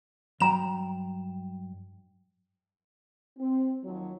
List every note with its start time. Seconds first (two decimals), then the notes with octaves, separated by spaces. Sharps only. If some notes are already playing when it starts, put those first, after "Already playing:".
0.40 G2 F#3 G5 A#5 E7
3.38 C4
3.84 D#2 F3 F#3